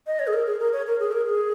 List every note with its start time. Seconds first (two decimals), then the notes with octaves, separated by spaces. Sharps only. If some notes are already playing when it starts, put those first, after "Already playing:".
0.07 D#5
0.19 C#5
0.27 G#4
0.33 A#4
0.47 G#4
0.60 A#4
0.73 C#5
0.87 A#4
1.00 G#4
1.12 A#4
1.26 G#4